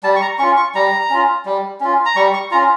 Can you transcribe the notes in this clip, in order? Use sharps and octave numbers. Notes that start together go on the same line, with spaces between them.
G3 A5
C#6
A#5
C#4 F4 C#6
C#6
G3 A#5
C#4 F4
G3
C#4 F4
A#5
G3 C#6
C#6
C#4 F4 A#5